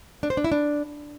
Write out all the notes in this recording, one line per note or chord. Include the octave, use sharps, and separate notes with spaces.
D4
C5
D4
E4
D4